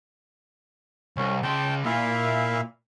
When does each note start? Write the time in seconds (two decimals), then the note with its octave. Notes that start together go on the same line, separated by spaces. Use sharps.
1.17 C2 C#4
1.43 C#3 G5 A5 C6
1.86 A#2 E4 E5 F5